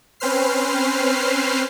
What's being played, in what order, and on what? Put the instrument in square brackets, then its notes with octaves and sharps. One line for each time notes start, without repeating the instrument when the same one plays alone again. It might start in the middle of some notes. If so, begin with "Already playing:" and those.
[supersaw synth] C4 C#4 B4 C5 F6 C7